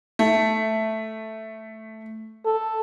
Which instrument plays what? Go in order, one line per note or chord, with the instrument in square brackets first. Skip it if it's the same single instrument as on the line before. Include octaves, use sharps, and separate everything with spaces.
[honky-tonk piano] A3
[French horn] A4